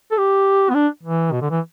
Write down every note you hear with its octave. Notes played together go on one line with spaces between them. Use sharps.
A4
G4
B3
D4
E3
B2
D3
E3